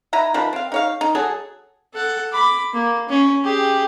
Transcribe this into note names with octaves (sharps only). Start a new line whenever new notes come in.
D#3 E4 B4 A#5
D#3 F3 B4
C4 F5
D#4 C#5 F5
D#4
F#3 G#4 A4
A4 F#5
B5 D6
A#3
C#4
G4 G#4